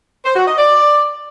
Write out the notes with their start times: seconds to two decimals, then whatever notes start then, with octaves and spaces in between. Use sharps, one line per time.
0.25 C5
0.36 F#4
0.47 D#5
0.58 D5